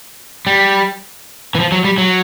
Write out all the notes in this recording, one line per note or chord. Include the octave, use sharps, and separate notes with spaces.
G3
E3
F3
F#3
G3
F#3